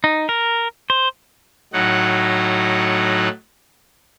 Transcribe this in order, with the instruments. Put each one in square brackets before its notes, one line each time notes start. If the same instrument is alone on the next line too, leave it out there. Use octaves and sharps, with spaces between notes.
[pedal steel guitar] D#4
A#4
C5
[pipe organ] A2 F#3 D#4 F#5